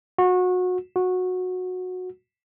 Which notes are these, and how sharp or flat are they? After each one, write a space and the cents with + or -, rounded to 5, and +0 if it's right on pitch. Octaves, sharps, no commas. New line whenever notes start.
F#4 -25
F#4 -15